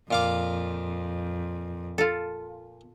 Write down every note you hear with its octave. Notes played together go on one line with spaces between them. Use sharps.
F2 A#2 F5 D6
F4 A4